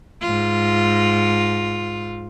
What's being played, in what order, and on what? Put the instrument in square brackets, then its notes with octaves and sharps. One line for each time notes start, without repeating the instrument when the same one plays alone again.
[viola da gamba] G#2 F4